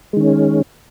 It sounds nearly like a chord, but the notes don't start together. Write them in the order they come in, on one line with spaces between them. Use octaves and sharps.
G#3 D#3 C#4